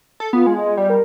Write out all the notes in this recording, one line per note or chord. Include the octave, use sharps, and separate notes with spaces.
A4
B3 F4
G#3
D#5
G3 D5
A#4